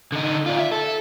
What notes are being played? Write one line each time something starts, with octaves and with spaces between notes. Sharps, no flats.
D3 D#4
F4 D5
E5
A4